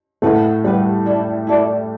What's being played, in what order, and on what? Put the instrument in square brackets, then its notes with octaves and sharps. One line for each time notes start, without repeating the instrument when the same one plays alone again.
[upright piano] A2 A3 [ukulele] B4 F#5 B5
[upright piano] G3 [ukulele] B4 F#5 B5
[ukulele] E4 A4 D5
E4 A4 D5